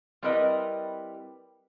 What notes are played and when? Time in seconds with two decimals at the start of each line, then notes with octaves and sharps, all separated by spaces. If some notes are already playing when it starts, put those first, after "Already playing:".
0.22 G3 C4 E4 A#4 B4 D#5